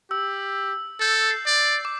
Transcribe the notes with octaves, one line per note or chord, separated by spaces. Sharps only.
G4 E6
A4 G6
C7
D5
D6